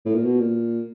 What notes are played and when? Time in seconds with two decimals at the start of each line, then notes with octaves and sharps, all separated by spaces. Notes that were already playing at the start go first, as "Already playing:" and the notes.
0.05 A2
0.15 A#2
0.25 B2
0.40 A#2